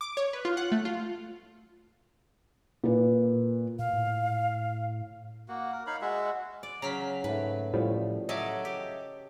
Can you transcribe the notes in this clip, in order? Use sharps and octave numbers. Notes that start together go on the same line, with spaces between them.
D6
C#5
B4
F4
F#5
A3
F4
A#2 B4
A#2 F5
A2
A#3 F#4
A#4
D#4 C#5 F5 B5
G#3 F#4 E5
D5
C#3 F#3 A#5 F6 B6
G#2 A3 B4
A2 F3 G3
F#3 A4 D#5 E5 G#5 D6
G4